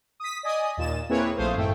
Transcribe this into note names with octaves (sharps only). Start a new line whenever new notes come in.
D#6 B6
D5 D#5 G#5 D#6
D#2 A#2 A6 E7
A#3 C4 E4 G#4 B4 C#5
A#1 A3 C5 F5 D#6
G#1 F#2 A2 A3 G5